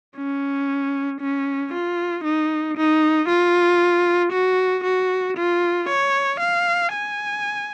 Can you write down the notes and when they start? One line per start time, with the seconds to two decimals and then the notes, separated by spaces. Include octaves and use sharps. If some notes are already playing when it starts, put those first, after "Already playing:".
0.17 C#4
1.21 C#4
1.73 F4
2.24 D#4
2.77 D#4
3.29 F4
4.32 F#4
4.84 F#4
5.37 F4
5.89 C#5
6.40 F5
6.93 G#5